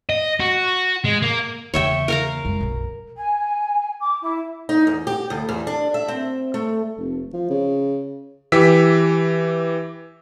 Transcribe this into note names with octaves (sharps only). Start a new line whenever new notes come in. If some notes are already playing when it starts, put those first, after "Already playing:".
D#5
F#4
G#3
A#3
E2 C#3 C#5 E5 G5
A#4 F5 A#5
F#2 G#3
B1 F#2
G#5
D6
E4
D#4
E2
G4
D2
E2
D4
E5
C4
A3
F1
F3
C#3
E3 G4 E6 B6